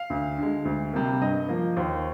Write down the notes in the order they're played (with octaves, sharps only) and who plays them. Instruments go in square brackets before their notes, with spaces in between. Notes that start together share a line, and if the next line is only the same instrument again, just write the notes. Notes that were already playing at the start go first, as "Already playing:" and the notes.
Already playing: [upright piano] F5
D2
D3 G#3
D2
C3 G3 A#3
G2 D#5
F3 A#3
D#2 C5